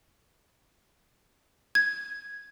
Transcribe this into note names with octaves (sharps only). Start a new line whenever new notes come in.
G#6